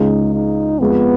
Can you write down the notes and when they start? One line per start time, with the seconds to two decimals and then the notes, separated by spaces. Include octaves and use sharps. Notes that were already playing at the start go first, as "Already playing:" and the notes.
Already playing: C#2 C#3 G#3 D#4
0.34 D#4
0.80 F2 F3 G#3 B3